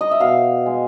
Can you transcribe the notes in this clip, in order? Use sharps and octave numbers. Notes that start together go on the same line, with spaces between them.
D#5
E5
B2 F5
G#3